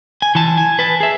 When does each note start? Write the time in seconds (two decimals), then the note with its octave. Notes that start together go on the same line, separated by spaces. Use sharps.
0.22 G#5
0.35 E3 A5
0.57 G#5
0.79 B4 A5
1.00 G#4 E5